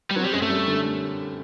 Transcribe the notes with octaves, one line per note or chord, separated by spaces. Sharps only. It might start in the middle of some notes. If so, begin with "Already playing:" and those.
G3
F#3 C4
G3
F#2 G#3
A3
G3
D3